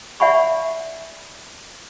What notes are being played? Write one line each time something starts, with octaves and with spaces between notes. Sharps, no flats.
D5 E5 F#5 G#5 B5 C#6